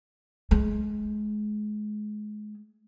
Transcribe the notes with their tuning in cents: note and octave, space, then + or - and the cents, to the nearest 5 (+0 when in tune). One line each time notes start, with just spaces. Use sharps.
G#3 +25